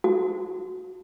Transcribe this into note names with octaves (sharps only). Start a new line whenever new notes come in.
F#4